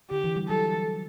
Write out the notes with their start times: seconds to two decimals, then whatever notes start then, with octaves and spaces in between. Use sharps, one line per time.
0.10 D3 G4
0.24 E3
0.36 G3
0.49 F#3 A4